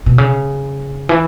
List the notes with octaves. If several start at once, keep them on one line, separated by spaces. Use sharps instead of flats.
B2
C#3
E3